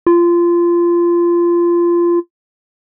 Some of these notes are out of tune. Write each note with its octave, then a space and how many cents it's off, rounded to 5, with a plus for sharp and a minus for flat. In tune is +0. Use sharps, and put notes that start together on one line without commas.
F4 -20